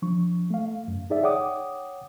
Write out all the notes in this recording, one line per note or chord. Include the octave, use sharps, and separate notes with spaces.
F3 D4 C#6
A3 F5
F#2
D#4 G#4 D5 E5
C#5 F#5 G5 D6 D#6